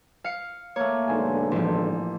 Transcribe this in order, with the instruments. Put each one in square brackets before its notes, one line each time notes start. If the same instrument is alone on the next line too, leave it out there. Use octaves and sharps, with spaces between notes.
[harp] F5 C#7
[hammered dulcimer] A3 A#3 [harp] C#5
[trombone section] B1 G#2 D3 [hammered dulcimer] C5 G#5
[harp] A1 F3 [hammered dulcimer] C5